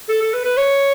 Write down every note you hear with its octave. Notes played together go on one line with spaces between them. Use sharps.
A4
A4
B4
B4
C#5